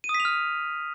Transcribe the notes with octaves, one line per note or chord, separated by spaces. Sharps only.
D#7
D#6
B6
F7
F6